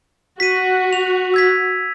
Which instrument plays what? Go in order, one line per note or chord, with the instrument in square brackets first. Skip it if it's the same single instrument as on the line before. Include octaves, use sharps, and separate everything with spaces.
[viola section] F#4 [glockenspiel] B6 D#7
[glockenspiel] F7
E6 G#6 B6